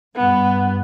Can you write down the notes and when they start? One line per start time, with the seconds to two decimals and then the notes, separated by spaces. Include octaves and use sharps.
0.16 G2 B3